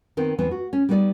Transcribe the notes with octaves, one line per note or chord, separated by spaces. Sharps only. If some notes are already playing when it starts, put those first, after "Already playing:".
D#3 B3 C4
E2 E3 B3 C4
F#4
C#4
G3 B3 D#4 C#5 D5